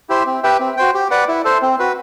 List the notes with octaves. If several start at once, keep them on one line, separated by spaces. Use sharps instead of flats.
E4 G4 C5 E5
C4
G4 B4 E5 G5
C4
F#4 C5 G5
G4
B4 D5 F#5
E4
A4 C5
C4
F#4 B4